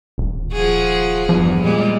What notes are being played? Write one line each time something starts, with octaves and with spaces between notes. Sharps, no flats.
D#1
F3 F#4 G#4
E2 G2 F3
A#2 G3 G#3